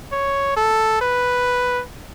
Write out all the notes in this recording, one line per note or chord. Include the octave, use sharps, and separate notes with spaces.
C#5
A4
B4